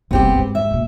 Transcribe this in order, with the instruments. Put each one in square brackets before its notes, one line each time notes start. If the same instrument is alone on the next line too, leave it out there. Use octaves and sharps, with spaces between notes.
[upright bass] F#1 C2 [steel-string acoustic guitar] B3 C4 G4
[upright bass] G#2
[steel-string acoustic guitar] E5
[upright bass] B2 A#3